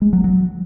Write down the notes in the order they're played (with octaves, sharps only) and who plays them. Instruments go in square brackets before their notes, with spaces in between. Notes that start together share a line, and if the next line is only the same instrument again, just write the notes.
[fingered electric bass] G#3
F#3
F#3